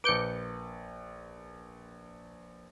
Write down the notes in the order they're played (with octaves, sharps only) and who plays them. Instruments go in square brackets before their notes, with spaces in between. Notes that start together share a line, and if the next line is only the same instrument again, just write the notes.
[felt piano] A#1 B4 [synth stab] D6 G6 C#7